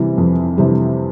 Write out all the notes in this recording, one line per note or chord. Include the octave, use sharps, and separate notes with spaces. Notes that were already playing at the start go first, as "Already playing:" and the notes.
Already playing: C3 E3 G3
F2
C3 E3 G3